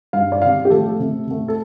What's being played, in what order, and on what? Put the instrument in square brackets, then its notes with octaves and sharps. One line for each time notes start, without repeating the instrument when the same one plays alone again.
[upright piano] G2 G3 F5
D5
C3 G3 F5
G4
A2 F3 A3 A4
C3 A3
C3 A3
A4